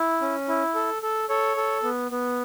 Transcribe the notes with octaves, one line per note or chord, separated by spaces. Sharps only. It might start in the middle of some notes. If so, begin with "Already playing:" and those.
Already playing: E4
C#4
E4
A4
A4
A4 C#5
A4
B3
B3